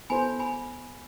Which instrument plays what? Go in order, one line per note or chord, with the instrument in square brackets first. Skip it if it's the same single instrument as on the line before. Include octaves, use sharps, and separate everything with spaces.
[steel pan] B3 E4 A4 C5 [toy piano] G#5 B5
[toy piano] G#5 B5